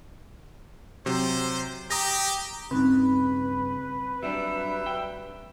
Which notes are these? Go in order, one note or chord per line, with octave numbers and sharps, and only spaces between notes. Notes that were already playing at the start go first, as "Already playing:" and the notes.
C3 F#3 C5
G4 A#5 D#6 A#6
G2 C#3 C4 D#4 B4
F#3 G3 D4 G4 E5
G5